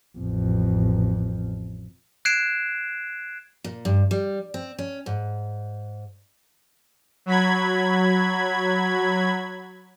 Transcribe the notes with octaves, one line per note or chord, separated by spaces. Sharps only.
A1 F2
F#6 G#6 C7 D7 E7
A#2
G2
G3
C4
C#4
G#2
F#3 B5 G#6